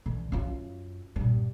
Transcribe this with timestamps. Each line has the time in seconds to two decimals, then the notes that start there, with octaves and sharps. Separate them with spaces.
0.06 D3 E3
0.32 F#2 F4
1.16 G2 A#2